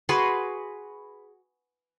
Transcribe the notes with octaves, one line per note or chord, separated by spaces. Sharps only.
F#4 G#4 B4 C6